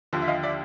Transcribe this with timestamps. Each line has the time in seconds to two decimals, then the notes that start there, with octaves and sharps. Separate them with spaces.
0.13 D#2 D3 F3
0.22 E5
0.28 D#5 F5
0.43 D5 E5